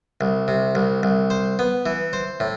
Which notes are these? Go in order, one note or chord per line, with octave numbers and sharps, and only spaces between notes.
C2
C3
C2
C2
C5
B3
E3
C5
A2